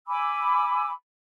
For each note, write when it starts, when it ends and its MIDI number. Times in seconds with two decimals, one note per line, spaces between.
0.08 0.92 80
0.08 0.92 83
0.08 0.92 86
0.08 0.92 88